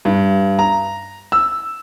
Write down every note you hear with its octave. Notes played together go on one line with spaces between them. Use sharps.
G2
A#5
E6